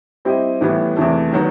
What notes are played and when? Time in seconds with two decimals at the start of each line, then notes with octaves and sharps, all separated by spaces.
0.25 G3 C4 E4 G4 D#5
0.61 A2 E3 G3 B3 E4
0.96 E2 C3 E3 A3
1.33 D#3 F#3 B3 F#4